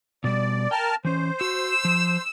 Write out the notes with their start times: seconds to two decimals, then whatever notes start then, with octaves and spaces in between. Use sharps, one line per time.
0.24 B2 G3 D5
0.71 A#4 G5 A5 F6
1.05 E3 C#4 C5
1.41 F#4 E6
1.85 F3